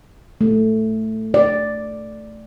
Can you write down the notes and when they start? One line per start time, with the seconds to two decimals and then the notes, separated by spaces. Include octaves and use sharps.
0.41 A3
1.34 D5